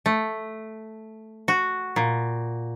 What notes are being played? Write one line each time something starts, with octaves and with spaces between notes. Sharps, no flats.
A3
F#4
A#2